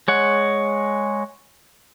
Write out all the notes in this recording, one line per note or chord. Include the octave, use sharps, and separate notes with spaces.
G#3 C#5 F#5